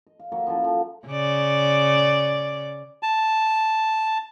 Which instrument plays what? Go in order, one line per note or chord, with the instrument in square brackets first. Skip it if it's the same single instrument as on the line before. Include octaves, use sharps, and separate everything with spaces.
[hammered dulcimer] D#5
F5
F#3 A#3 C#5
F3 C#4 E4 A4
F3 F#3
[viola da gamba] C#3 D5
[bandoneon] A5